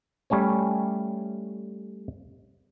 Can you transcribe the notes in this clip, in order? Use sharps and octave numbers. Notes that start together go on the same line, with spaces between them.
G3 A3 C#4 C#5